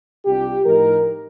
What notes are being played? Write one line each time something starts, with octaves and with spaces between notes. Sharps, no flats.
C2 C3 G3 D4 F4 G4
A2 F3 A3 D#4 A#4